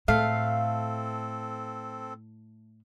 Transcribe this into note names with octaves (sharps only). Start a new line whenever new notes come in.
A2 A3 C4 A4 F5